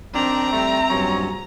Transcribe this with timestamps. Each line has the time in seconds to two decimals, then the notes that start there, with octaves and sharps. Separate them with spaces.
0.15 D#3 F3 C4 D4 A#5
0.52 G3 A3 E5
0.90 A#1 G2 F#3 C#4